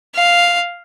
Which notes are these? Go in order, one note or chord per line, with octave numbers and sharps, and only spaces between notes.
F5